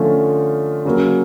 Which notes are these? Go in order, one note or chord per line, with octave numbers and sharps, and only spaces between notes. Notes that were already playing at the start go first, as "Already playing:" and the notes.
Already playing: D3 F3 A3 C#4 F4
C#3 F#3 A#3